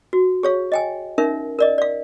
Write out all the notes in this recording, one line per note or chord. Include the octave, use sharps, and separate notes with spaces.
F#4
G#4 C#5 F5
D#5 G5 G#5
C#4 D#4 A#4 E5
A#4 D5 D#5
D5 F5